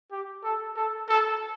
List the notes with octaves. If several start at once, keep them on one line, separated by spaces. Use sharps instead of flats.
G4
A4
A4
A4